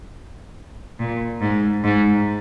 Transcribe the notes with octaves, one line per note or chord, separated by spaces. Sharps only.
A#2
G#2
G#2